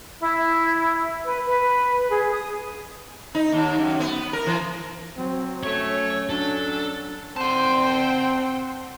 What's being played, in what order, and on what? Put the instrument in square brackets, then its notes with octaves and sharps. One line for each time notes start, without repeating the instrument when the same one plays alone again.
[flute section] E4
B4
B4
G#4
D#6
[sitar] D#4
D#2
F#2
B3
A#4
E3
[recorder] F#3 [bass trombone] C4
[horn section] A3 [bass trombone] C#4 [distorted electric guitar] C#5
[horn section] F#3 [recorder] D4 [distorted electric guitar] A4
[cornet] C4 [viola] C5 G5 [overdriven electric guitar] F#5 A5